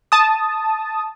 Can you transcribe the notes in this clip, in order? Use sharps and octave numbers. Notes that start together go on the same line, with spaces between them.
A5 D#6